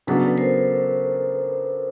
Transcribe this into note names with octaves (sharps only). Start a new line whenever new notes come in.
C#3 F#3 B3 D4 A4 B4
B4
A#4 C5